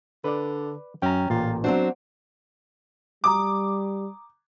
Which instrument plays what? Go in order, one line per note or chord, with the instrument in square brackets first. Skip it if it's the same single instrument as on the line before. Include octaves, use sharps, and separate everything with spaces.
[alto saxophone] D3 [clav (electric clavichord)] B4 D5
[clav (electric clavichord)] F#2 [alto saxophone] C#4 [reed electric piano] G5 A#5
[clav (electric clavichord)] A1 A#2 [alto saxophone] F4
[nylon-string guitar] F#3 C4 D4 [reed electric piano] B3 F#4 [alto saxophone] C5
[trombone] G3 [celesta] A#5 D#6 [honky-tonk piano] D6